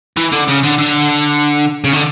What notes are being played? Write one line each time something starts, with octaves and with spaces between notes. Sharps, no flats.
E3
D3
C#3
D3
D3
C#3
D3